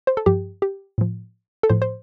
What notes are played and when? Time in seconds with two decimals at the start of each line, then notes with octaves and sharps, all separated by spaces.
0.07 C5
0.17 A4
0.26 G2 F3 G4
0.62 G4
0.98 A2 F3
1.63 A4
1.70 A2 F3 C5
1.82 C5